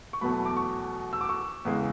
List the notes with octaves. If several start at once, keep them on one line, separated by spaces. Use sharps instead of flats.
C#6
E2 B2 F#3 A3 B5
D6
C#6
E6
D6
C#6
E2 C#3 E3 G#3